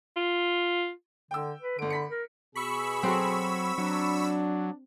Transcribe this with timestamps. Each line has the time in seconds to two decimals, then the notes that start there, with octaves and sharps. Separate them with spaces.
0.16 F4
1.31 D3 G5 E6
1.61 B4
1.78 G1 D3 D7
1.90 B5 B6 C#7
2.10 A#4
2.55 B2 G#4 B5 C#6 E6
3.03 F#3 C4 F#4 A4
3.78 F#3 D4